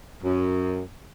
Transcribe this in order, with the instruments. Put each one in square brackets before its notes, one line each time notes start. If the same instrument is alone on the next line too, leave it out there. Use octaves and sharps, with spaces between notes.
[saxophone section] F#2